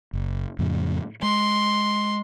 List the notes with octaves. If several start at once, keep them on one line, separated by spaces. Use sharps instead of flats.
F#1
F2 A2 C#3
G#3 C6